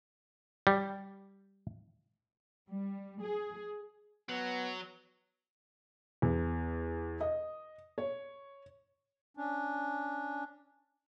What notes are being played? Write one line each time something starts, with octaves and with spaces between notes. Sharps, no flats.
G3
G3
G#4
F#3 B3
E2
D#5
C#5
C#4 D4